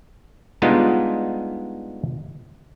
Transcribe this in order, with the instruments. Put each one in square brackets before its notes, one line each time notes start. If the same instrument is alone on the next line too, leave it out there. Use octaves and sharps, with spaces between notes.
[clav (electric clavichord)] G3 G#3 B3 D4 D#4 F4